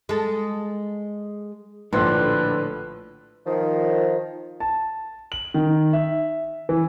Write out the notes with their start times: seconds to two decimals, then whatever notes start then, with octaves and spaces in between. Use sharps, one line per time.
0.09 G#3 A4
1.93 A#1 A2 D3 B4 C6
3.46 D#3 F3
4.60 A5
5.32 F#7
5.54 D#3
5.93 E5
6.69 E3